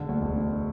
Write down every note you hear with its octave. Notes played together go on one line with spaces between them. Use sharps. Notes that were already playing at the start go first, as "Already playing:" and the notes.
Already playing: E1 D3
D2
E1
D3